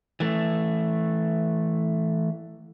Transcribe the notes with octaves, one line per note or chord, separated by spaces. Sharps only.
E3 A3